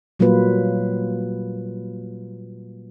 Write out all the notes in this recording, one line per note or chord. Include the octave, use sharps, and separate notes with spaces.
A#2 F#3 G3 A#3 F4 B4